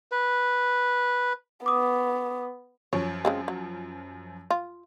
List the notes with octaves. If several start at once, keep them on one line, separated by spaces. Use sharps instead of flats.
B4
B3 D6 D#6
F#2 F3 C#5
C#3 G#3 C4
F#3
F4